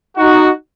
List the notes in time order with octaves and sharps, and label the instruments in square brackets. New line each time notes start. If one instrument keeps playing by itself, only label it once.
[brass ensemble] D#4 F#4